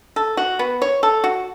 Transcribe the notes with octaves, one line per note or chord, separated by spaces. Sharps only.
A4
F#4
B3
C#5
A4
F#4